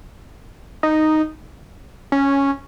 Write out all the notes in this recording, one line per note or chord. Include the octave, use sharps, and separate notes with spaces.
D#4
C#4